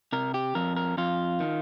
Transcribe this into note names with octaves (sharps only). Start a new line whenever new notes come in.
C3 A#4
G4
F2 A#4
A#4
F2 F4
D#3